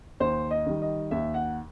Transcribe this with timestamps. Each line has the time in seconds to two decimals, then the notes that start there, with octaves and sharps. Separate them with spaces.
0.20 D#2 C5
0.51 D#5
0.66 D#3 G3
0.82 D#5
1.11 D#2 E5
1.34 F#5